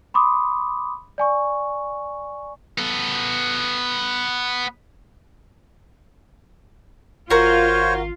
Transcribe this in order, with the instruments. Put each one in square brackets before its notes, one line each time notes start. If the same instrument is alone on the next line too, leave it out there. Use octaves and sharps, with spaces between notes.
[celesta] B5 C6 D6 D#6
D5 G#5 C#6
[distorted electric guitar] B3 A4
[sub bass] G#1 [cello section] F4 [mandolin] F#4 A#4 [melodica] C5 C#5